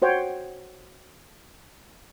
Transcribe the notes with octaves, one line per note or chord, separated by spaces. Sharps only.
F#4 C5 C#5 F#5 G5